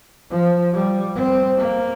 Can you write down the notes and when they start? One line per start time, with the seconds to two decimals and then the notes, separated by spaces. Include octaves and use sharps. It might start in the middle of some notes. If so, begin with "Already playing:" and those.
0.31 F3
0.73 G3
1.15 C4
1.58 A#3